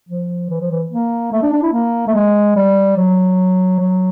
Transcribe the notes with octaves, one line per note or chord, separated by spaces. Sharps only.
F3
E3
F3
E3
A#3
A3
D4
D4
E4
A#3
A3
G#3
G3
F#3
F#3